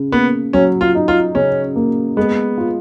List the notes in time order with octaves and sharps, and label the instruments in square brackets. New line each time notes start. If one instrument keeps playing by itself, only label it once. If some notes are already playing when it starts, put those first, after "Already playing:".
Already playing: [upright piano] C#3
[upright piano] A#3 [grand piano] B3
[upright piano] F#3 [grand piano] C#4
[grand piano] F4
[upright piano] D#4
[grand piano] F4
[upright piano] C#3 [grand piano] C#4
[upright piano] A#3
[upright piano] G#3 [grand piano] B3
[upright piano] F4